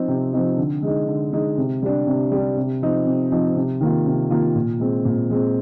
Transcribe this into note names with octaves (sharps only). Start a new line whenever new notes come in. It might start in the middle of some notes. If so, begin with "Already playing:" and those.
Already playing: F3 C4 D#4
C3
F3 C4 D#4
D3
G#3 D#4
D3
G#3 D#4
C3
G3 D4
C3
G3 D4
C3
F3 C4 D#4
C3
F3 C4 D#4
C3
D#3 A#3 F4
C3
D#3 A#3 F4
A#2
G#3 C4
A#2
G#3 C4